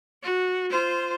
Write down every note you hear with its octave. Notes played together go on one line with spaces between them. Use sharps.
F#4
F4 C5